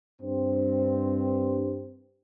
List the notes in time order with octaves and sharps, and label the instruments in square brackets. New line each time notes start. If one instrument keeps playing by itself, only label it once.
[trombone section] G2 C4